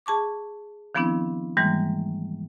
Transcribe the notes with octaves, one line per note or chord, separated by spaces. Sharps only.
G#4 A5 C#6 D6
D#3 F3 B3 C4 D4 E4
G#2 D#3 E3 G3 G#3 A#3